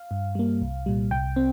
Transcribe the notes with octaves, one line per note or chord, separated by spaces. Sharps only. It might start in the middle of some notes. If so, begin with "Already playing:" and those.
Already playing: F5
G2
G3 A#3
C2
A#2 G3
C2 G5
C4